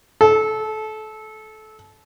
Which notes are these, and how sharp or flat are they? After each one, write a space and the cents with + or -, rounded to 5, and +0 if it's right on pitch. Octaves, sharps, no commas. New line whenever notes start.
A4 -25